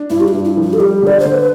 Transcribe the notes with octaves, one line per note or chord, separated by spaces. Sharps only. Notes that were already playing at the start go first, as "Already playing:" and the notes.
Already playing: D4
G2 E4
G4
F4
G2
E4
F3
F4
A4
G3 G4
D3 D5
D3 C5
B4